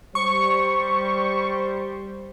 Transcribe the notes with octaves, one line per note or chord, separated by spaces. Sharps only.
G3 C5 C#6